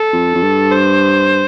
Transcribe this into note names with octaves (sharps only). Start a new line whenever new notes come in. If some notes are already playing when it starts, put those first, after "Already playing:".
Already playing: A4
F2
F2
G2
C5